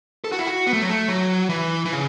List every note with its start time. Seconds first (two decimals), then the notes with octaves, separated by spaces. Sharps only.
0.24 A4
0.32 F#4
0.39 E4
0.47 F#4
0.67 B3
0.73 A3
0.82 F#3
0.89 A3
1.08 F#3
1.49 E3
1.86 E3
1.92 C#3